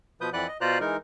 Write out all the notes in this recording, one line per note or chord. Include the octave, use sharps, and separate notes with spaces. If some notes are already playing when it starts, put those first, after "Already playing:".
B2 F3 B4 D#6 G6
F2 E3 B4 D5 F#5 F#6
D#5
B2 F4 C5 D5 A#5 F#6
E3 G#3 D#4 A#4